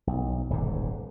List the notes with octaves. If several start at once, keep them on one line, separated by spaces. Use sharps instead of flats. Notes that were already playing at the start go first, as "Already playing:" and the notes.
B1
D#1 G#1 G#2 D3